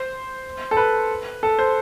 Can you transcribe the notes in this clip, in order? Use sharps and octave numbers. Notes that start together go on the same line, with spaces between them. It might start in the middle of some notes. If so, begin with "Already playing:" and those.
Already playing: C5
A4
B4
A4
C5